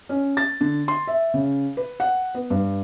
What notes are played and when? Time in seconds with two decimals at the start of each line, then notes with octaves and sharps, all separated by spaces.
0.09 C#4
0.37 A6
0.61 D3
0.88 C6
1.07 E5
1.34 C#3
1.77 B4
2.00 F#5
2.35 B3
2.50 G2